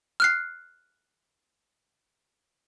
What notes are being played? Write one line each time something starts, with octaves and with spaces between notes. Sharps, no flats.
F6 F#6 C7